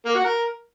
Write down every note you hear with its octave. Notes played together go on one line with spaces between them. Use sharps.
A#3
F#4
A#4